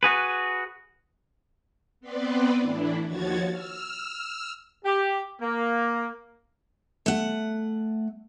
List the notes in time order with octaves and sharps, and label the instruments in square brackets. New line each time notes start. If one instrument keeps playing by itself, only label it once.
[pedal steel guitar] F#4 G#4 B4
[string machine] B3 C4 B4 C5 D5
A2 E3 D4 E4
D#2 F3 F#4 C#5 G#6 A6
E6 F6
[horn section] G4
A#3
[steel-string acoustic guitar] A3 F#5